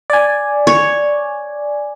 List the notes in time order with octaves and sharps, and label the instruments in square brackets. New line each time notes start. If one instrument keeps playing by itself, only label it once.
[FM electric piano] D5 G#5
[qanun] C#5